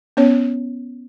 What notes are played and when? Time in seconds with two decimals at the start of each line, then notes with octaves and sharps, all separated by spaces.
0.17 B3 C#4 C#5